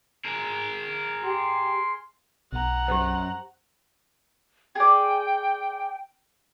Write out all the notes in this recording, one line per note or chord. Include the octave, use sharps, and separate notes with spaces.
G#4 A#4
G4 C6
B1 F#5 A#5
F#2 G4 C5
G#4 D5 G5